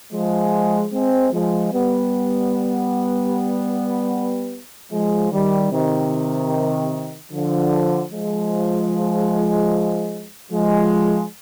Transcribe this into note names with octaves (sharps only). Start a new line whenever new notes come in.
F3 G#3
G#3 C4
F3 G#3
G3 B3
F3 G#3
D#3 G3
C3 D#3
D3 F3
F3 G#3
F3 G#3